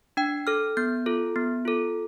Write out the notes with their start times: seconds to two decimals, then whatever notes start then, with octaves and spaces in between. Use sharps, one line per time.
0.17 D4 G5
0.47 A4 F6
0.77 B3 G6
1.06 F4 A4
1.36 B3
1.65 F4 A4